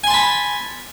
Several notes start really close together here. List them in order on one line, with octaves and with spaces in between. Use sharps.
G#5 C6 A5 B5